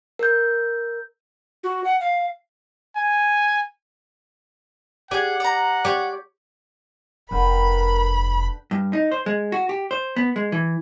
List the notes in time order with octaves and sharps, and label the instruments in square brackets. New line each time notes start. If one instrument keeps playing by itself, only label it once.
[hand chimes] A#4 G6
[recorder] F#4
F#5
F5
[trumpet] G#5
[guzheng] G4 G#5 [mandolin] G#4 D5 [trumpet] F#5
[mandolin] D5 A#5
[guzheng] G4 C#5 [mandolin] D5
[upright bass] F1 [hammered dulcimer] D3 B4 G5 [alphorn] A#4 [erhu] B5
[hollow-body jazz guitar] G2
D#4
C5
G#3
F#4
G4
C5
B3
G#3
E3